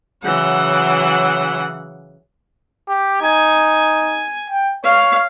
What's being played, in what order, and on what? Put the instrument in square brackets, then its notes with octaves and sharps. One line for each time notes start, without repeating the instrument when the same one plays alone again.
[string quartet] C#3 E3 F#3 F#5
[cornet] G4
[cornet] D#4 [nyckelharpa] G#5
[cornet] G5
[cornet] C#5 [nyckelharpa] F5